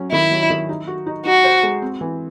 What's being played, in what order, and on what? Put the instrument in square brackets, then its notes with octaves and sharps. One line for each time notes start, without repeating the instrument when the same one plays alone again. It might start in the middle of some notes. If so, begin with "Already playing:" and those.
Already playing: [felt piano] F#3 C#4
[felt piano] D#3 [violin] E4
[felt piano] F#3
D#3
D#4
F#4
D#4
[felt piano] D#4 [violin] F#4
[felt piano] C5
G#3
C4
E3